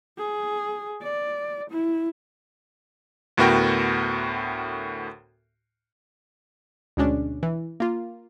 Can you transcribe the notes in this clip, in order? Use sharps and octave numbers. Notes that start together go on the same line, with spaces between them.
G#4
D5
E4
D2 A2 B3 F#4 A#4 G5
D2 B2 G#3 C#4 D4
E3
A#3 F4